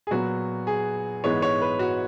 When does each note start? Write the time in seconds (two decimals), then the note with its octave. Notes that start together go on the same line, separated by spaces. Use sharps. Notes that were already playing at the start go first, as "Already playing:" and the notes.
0.07 G#4
0.11 A#2 F#3 B3 F#4
0.67 G#4
1.24 G#2 E3 G#3 B3 C#5
1.42 C#5
1.61 B4
1.79 F#4